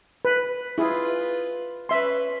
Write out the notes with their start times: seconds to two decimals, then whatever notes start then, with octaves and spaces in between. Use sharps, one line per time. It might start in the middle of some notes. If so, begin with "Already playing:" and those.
0.25 B4
0.78 E4 F4 G#4 B4
1.89 C#4 B4 E5 C6